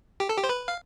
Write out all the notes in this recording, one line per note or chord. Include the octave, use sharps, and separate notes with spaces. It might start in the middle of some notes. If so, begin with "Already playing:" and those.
G4
A4
G4
C5
B4
F5